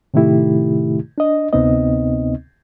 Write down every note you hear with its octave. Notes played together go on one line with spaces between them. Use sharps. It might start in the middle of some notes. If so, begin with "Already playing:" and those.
A2 C3 D#3 A3 E4 G4
D4 D#5
D2 C3 B3 C4 D#4 D#5